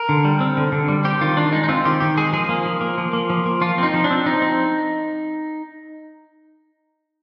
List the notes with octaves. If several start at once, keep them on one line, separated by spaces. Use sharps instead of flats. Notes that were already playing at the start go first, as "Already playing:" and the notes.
Already playing: A#4
D3
G3
C4
D3
D3
G3
C4 G4
D#3 F4
D#3 D4
G#3 D#4
D#4
C4 F4
D#3 G4
D#3 G4
G#3 G#4
F3 G#4
A#3
F3
A#3
F3
A#3
F3
A#3
F3 F4
C4 D#4
F3
D4
C4
F3 D#4
C4